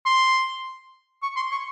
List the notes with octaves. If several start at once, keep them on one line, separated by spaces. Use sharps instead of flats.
C6
C#6
C6
C#6